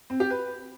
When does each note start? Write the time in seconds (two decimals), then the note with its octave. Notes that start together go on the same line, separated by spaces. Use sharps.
0.10 C4
0.20 G4
0.30 B4